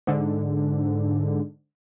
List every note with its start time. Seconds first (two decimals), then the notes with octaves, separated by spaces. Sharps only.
0.07 G#2 D3